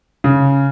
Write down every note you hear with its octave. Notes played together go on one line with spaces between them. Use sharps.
C#3